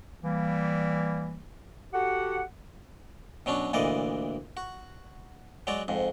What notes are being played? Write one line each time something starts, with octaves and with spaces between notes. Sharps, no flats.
E3 G3 A#3
F#4 G4 A4 F#5
B2 F#3 C#4 D4
D2 A#2 E3 D5 D#5
F#4
F#3 G#3 F#4 D5
F2 G#2